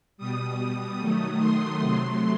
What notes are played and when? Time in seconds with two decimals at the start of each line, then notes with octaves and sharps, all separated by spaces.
0.17 B2 G3 D#6
0.99 D#3 F#3 A3 D#6
1.39 C6
1.80 C3 F#3 A3